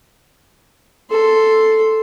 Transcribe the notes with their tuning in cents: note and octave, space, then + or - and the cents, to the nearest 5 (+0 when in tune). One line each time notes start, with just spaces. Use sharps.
A4 +0 C6 +0